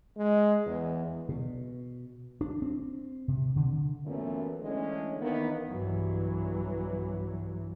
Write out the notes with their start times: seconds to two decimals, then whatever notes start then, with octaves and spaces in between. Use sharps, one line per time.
0.17 G#3
0.66 E2
1.29 B2
2.41 D4
2.62 C4
3.28 C3
3.56 D3
4.06 F#2 A#2 E3 A3 B3
4.62 D3 E3 G#3 A3 C#4
5.20 D#3 E3 A#3 B3
5.70 B1 G2 E3 F#3